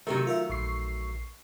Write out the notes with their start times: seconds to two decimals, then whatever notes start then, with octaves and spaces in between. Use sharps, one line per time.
0.07 C3 D#3 F#3 A3 G4 A#4
0.27 F4 A#4 E5
0.49 A#1 C#6 C7